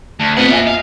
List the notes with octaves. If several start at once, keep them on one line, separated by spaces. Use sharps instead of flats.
D2 A5
F2 B3 C5 D#5 F#5
A#2 E5 G#5
D#5 F5